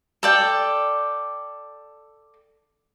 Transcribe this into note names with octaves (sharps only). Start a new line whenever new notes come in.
A4 D5 G5